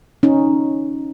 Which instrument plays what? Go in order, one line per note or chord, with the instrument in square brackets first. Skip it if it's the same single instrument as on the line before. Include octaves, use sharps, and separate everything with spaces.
[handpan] C#4 D#4